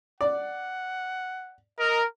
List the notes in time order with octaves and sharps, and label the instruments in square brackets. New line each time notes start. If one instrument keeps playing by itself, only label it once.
[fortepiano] D5 [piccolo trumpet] F#5
[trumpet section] A#4 [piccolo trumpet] D#5